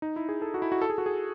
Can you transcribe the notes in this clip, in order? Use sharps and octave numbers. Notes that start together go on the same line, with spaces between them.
D#4
E4
G#4
A4
F#4
E4
F#4
A4
G#4
F#4
G#4